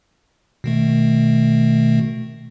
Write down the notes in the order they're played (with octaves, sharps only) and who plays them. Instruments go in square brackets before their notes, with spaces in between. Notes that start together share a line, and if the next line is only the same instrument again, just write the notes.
[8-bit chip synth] B2 D#3 A3